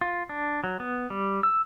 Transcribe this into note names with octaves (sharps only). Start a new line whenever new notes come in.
F4
D4
F#3
B3
G3
E6